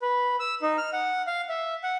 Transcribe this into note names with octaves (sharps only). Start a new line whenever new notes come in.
B4
E6
D#4
F6
F#5
F5
E5
F#5